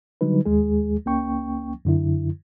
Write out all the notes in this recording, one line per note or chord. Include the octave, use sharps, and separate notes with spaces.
D3 F#3 G3 D#4 B4
D#2 G#3 G#4
C#2 A#3 C#4 G5 C#6
F#2 D3 E4